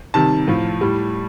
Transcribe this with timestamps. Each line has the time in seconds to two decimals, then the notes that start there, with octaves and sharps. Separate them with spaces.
0.14 C3 D#3 G3 A5
0.48 A2 F3
0.81 A2 G3